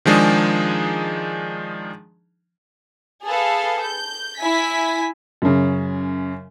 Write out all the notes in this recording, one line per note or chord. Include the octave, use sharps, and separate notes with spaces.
D#3 F3 G#3 D4 D#4 G#4
G#4 A4 B4 F5
G6
E4 G#5 B6
F#2 C#3